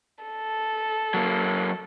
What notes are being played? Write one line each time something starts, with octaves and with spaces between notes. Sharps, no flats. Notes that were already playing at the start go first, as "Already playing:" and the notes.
A4
F#3 A#3